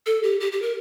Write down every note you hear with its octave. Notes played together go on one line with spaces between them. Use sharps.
A4
G4
G4
G4
A#4